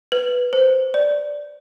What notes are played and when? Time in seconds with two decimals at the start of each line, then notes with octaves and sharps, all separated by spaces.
0.12 B4
0.53 C5
0.94 D5